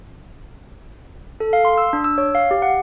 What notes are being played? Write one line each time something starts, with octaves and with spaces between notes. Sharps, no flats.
A4
F5
C6
E6
D4
E6
C#5
F5
G4
F#5